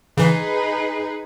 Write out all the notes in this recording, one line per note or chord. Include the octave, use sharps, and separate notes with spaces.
C#3 E3 D#4 G#4 B4